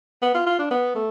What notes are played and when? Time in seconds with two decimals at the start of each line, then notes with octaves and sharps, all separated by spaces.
0.22 B3
0.35 F4
0.46 F4
0.59 D4
0.71 B3
0.95 A3